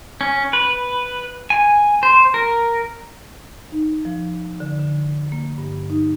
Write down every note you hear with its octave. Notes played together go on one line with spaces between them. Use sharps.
C#4
B4
G#5
C5
A#4
D#4
F3
D3
D3
A#3
G2
D#4